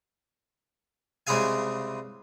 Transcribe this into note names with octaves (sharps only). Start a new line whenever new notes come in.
C2 C#3 G#3 G#4 F5 G#5